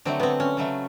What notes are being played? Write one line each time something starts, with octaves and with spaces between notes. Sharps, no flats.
D3 F#3 A3 C4
B3 C4
C#4
C#3 F#3 A3